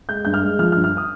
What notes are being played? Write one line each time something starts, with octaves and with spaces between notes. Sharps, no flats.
G#3 G6
G2 G6
F6
G#3
F3 F6
F6
G2
F6
D#6